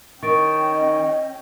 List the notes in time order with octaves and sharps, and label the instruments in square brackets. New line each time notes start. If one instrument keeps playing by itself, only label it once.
[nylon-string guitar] D#3 [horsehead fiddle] C#4 G5 [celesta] C#6 A6 D7
[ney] D#5